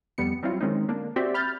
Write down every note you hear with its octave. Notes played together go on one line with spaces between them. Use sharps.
F2 G3 B3 C#7
F#3 G3 C4 E4 F4
D#3 G#3 C4 C#4 D#4
D3 A#3 D4
C4 F#4 G4 C5 D5 E5
B5 F6 G6 A6